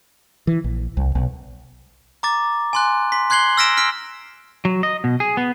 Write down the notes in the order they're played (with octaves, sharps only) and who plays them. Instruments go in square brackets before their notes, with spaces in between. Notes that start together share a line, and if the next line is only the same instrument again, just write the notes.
[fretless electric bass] E3
A#1
C2
B1
[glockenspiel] A#5 D6 A6
G#5 C6 F#6
C6 B6
C6 F#6 G#6 C7 F#7 G7
E6 F6 A#6 B6 D7 E7
E6 F6 B6 D7
[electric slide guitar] F#3
D#5
B2
G#4
B3